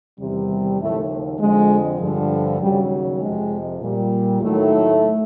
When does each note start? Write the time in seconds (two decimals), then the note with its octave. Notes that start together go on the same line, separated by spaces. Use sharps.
0.19 E2 C3 D#3 G3
0.80 D#2 A2 C#3 F3 A3
1.40 F2 D3 F3 G#3
2.00 G2 D3 F3
2.61 D#2 C#3 F#3 G3
3.21 F2 C3 F3 G#3
3.81 A#2 G3
4.41 D#2 A2 D#3 F#3 A3